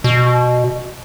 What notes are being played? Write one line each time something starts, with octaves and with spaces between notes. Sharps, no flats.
B2